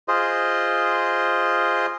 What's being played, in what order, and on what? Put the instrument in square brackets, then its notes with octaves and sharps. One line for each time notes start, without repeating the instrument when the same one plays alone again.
[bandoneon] F4 G#4 C5 D#5